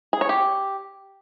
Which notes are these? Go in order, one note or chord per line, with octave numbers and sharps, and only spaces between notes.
G#4
C#5
G4